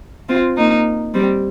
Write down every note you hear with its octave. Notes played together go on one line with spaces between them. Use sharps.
C4 F4
A#3 D#4
G3 C4